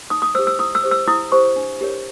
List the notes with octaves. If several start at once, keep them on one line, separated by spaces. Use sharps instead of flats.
D#4 D#6
D#6
G4 C5 E6
E6
E4 D#6
E6
G4 C5
E6
E4 D#6
G4 C5 C#6
D4
G4 A#4 C#5